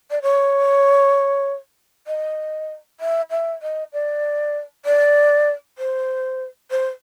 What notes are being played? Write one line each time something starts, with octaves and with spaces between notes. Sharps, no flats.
D5
C#5
D#5
E5
E5
D#5
D5
D5
C5
C5